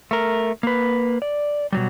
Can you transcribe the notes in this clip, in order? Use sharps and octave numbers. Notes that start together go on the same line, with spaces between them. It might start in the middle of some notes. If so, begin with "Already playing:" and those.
A3 A#4
A#3 B4
D5
B2 F#3 G3